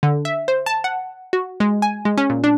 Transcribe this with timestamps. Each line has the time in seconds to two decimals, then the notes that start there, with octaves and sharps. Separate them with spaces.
0.03 D3
0.25 E5
0.48 C5
0.66 A5
0.84 F#5
1.33 F#4
1.60 G#3
1.82 G#5
2.05 G#3
2.18 C#4
2.30 A#2
2.44 D4